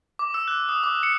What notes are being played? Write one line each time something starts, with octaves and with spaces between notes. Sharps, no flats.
D6
E6
F#6
D#6
D6
C#7